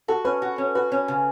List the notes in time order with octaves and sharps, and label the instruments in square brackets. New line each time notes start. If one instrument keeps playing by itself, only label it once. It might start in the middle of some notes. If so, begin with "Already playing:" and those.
[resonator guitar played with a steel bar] F#4 [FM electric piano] A4
[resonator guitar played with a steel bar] C#4 [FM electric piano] B4
[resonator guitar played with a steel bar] F#4
C#4
[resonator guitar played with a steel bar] F#4 [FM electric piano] B4
[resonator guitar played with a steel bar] C#4
C#3